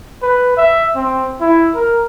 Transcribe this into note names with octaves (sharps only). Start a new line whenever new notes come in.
B4
E5
C4
E4
A#4